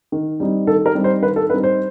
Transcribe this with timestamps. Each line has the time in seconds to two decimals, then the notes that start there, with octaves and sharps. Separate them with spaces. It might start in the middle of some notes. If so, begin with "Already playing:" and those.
0.12 D#3
0.40 G3 C4 D#4
0.67 D#3 A4
0.86 A#4
0.95 G3 C4 D#4
1.04 C5
1.22 D#3 B4
1.36 A4
1.50 G3 C4 D#4 B4
1.63 C5